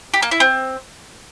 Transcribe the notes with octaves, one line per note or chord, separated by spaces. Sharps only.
G4
A#3
E4
C4